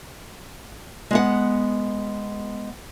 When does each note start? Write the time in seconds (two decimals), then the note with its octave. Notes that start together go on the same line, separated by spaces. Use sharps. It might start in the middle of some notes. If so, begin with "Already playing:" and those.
1.11 G#3 B3 F#5